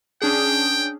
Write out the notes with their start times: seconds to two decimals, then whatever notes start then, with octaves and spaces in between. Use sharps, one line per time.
0.22 C#4 D4 G#4 G5